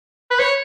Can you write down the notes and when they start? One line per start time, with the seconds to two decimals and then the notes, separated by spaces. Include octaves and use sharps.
0.31 B4
0.39 C#5